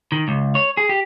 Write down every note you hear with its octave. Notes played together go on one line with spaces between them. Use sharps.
D#3
C#2
C#5
G#4
G4